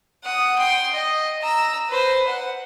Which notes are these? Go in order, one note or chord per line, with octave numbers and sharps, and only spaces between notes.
F#5 D#6
G5 C6
D#5
A#5 E6
B4 C5
F#5